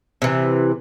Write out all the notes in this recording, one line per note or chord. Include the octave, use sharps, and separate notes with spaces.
C3 E3